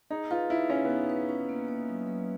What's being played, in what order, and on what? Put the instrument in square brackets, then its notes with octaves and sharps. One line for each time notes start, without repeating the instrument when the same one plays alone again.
[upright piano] D#4 [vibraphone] G#4
[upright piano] F4 [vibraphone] B4
[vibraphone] D#4 [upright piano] E4
[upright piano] C#4 [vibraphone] G#4
[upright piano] B3 [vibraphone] D#4
[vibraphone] B4
C#4
A#3
A#3
F#3
F#3